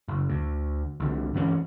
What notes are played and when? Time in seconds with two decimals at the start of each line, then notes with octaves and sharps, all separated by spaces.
0.08 F#1
0.30 D2
1.00 C2 D3
1.34 G2 E3 A#3 C#4